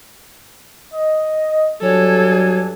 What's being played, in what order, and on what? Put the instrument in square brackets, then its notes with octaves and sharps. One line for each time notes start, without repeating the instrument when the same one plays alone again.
[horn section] D#5
[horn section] G2 D4 G#5 [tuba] F#3 [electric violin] A4 [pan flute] C#5